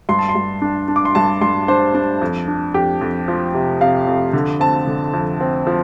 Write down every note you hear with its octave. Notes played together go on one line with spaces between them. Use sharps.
G2 C6
A5
C6
G2
D4
D4
D6
C6
G2 A5
G2 C6
D4 C5
D4
F2
D4
F2 G4
F2
F3
C3
C3 F5
F2
D3
C4 A5
D3
F2
C4
F3